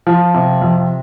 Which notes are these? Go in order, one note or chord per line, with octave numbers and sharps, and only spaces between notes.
F3
C3
F2